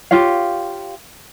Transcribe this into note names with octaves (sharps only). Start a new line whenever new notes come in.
F4 G4 C#5 F5